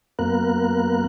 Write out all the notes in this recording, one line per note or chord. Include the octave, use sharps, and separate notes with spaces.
F#2 A#3 B3 A#4 F#6